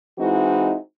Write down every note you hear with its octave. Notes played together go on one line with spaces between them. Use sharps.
E3 G#3 C4 D#4 E4 F#4